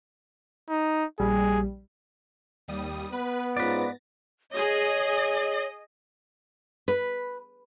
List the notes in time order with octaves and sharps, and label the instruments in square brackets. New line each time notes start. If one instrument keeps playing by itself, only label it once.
[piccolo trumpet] D#4
[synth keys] A#1 G3 [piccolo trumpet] G#4
[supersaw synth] D#2 G3 D#6
[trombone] B3 [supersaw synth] B4
[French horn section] G#2 C#4 F4 [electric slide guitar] B4 D5 [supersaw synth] A6 A#6
[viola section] G#4 D#5 [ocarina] C#5
[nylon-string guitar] B4